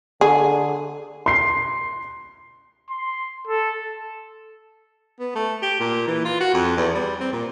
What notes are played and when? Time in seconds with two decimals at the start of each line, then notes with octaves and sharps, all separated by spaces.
0.21 D3 G#4
1.26 C6 C7
2.90 C6
3.47 A4
5.20 B3
5.35 A3
5.62 G4
5.80 A#2
6.08 E3
6.25 F4
6.40 F#4
6.54 F2
6.77 E2
6.94 G3
7.21 C4
7.33 A#2